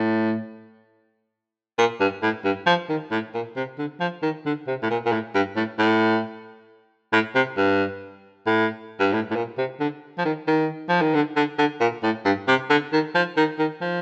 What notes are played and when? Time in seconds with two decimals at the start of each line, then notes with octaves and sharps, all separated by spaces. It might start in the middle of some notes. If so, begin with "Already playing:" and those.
Already playing: A2
1.78 A#2
2.00 G2
2.23 A2
2.44 G2
2.66 F3
2.89 D#3
3.11 A2
3.34 A#2
3.56 C3
3.78 D3
4.00 F3
4.22 D#3
4.46 D3
4.67 C3
4.82 A2
4.90 A#2
5.05 A#2
5.12 A2
5.34 G2
5.56 A2
5.78 A2
7.12 A2
7.35 C3
7.57 G2
8.46 A2
8.99 G2
9.13 A2
9.30 A2
9.35 A#2
9.58 C3
9.80 D3
10.18 F3
10.25 D#3
10.47 D#3
10.88 F3
11.01 D#3
11.14 D3
11.36 D3
11.58 D3
11.80 A#2
12.03 A2
12.25 G2
12.48 C3
12.70 D3
12.92 D#3
13.15 F3
13.37 D#3
13.59 D#3
13.81 F3